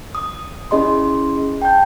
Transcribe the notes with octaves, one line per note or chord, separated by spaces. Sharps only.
D#6
C#4 E4 G#4 D#5 B5 C6
G5 A5 G6